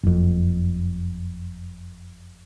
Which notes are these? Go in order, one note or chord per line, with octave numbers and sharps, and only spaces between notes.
F#1 F2